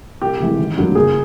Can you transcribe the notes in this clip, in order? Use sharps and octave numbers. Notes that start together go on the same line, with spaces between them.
C2 G4
C3 E3 G#3
G#1
G2 D3 F#3 A#3
F#1 G#4